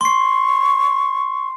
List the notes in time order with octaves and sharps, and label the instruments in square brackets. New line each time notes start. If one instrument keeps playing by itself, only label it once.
[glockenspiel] C6 C7 [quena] C#6